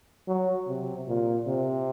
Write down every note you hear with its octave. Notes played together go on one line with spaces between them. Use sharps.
F#3
C3
A#2
C3